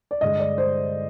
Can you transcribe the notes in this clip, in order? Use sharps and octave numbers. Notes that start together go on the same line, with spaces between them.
D5
G2 D3 G#3 D#5
D5
C5